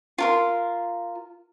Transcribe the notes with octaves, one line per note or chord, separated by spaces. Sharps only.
F4 A#4 C6